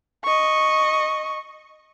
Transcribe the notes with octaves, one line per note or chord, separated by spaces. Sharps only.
D#5 C#6